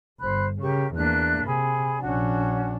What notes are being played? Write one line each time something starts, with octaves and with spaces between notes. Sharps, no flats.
G1 C5 B5 F#6
C#3 G4 A#4 C#6
E2 A#3 D4 E5 F#6
C3 G#4 B5
A#1 C#4 D4 F#4 F#5